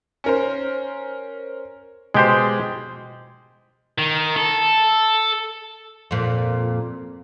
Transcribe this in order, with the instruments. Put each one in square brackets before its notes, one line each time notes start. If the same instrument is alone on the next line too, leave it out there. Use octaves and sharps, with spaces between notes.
[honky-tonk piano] C#4 A#4 C5
[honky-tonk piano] B2 G6 [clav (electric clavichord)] G#3 G4 C5
[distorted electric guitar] D#3
A4
[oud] F2 A#2